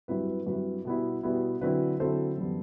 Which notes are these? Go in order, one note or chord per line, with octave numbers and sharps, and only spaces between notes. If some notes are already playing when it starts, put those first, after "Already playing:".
G2 F#3 C4 E4 B4
B4
G2 F#3 C4 E4 B4
B2 G3 B3 E4
B2 G3 B3 E4
D3 F#3 C4 E4 B4
D3 F#3 C4 E4 A4 C5
F#2 E3 G3 B3